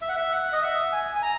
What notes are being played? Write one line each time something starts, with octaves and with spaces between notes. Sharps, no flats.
E5
F#5
E5
F#5
D#5
E5
G#5
G#5
A#5